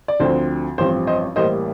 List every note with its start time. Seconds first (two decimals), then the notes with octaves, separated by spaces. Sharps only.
0.08 D5
0.20 D2 D3 F3 C4 C5
0.78 A1 G2 F3 C4 C5
1.07 C5 D#5
1.36 A1 A2 G3 A#3 C5 D#5